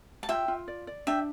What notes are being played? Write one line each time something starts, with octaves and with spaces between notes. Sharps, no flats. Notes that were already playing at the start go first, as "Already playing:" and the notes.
A5
F4 E5 G5
F4
D5
D5
D4 E5 G5